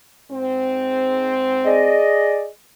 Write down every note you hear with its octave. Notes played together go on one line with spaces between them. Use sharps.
G#2 C4
G#4 D5 D#5